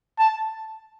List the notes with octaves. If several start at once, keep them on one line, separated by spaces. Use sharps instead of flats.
A5